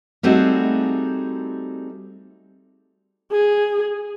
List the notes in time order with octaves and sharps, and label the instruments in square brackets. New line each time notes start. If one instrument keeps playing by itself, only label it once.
[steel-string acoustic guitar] G3 A3 C4 D#4 F#4 G#4
[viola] G#4